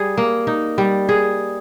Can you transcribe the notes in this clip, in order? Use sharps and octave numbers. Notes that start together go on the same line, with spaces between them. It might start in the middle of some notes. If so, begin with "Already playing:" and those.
Already playing: G3 G#4
A#3
D#4
G3
G#4